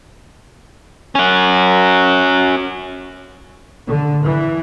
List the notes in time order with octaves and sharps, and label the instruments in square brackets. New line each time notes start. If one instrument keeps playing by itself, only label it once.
[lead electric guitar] C#4 F#4
[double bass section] D3
E3